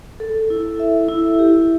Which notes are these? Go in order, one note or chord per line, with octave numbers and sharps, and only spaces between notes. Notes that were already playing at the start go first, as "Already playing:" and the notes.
A4
E4
E5
E4
G4